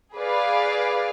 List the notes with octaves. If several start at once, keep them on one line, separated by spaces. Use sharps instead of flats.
G#4 B4 D5 F5